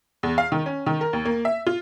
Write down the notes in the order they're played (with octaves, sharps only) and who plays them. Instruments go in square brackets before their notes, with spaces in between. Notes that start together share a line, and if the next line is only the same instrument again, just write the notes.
[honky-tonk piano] E2
F5
D#3
C#4
D#3
A#4
D#2
A#3
E5
F4